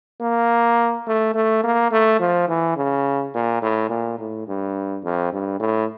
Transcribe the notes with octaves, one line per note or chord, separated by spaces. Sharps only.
A#3
A3
A3
A#3
A3
F3
E3
C#3
A#2
A2
A#2
A2
G2
F2
G2
A2